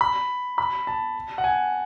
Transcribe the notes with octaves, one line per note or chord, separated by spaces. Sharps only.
B5
B5
A5
F#5
G#5